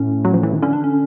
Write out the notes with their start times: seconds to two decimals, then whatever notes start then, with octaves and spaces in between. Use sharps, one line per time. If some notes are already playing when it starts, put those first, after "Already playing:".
Already playing: A2 C#4
0.25 F#3
0.34 F3
0.43 E3
0.53 D#3
0.62 D3 C#4
0.73 D4
0.84 C#4